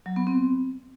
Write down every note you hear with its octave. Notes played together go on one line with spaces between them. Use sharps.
F#3
B3
C4